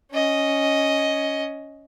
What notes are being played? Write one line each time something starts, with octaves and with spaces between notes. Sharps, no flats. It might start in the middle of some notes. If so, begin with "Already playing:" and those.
C#4 D#5